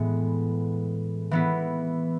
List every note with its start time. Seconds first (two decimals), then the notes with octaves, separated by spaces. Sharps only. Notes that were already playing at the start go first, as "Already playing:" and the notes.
Already playing: A2 E3 G#3 B3
1.31 E3 B3 E4